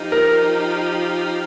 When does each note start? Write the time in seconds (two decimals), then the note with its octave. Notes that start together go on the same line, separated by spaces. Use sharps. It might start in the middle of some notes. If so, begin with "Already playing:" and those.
Already playing: F3 D#4 G4
0.12 A#4